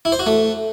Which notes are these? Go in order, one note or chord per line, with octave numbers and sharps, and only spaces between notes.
E4
C5
F#4
A3